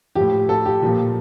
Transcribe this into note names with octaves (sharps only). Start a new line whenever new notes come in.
A2 F3 G4
A4
G4
A#2 F3